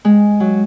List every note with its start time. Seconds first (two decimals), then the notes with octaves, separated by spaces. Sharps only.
0.05 G#3
0.40 F#3